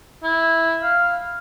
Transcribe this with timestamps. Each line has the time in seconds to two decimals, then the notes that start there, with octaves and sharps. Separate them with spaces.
0.23 E4
0.82 F5